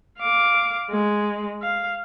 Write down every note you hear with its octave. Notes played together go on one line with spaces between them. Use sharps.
F5 D6
G#3
F5